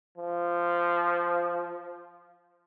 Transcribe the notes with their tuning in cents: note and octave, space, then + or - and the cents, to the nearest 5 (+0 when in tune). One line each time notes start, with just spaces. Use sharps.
F3 -10